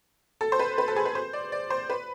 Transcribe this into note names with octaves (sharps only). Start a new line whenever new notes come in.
A4
C5
B4
B4
A4
G#4
B4
C5
D5
D5
C5
B4